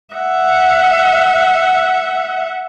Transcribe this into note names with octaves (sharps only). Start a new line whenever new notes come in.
E5 F#5